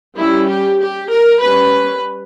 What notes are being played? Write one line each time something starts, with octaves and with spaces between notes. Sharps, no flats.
G3 C#4 E4
G4
G4
A#4
G3 C#4 B4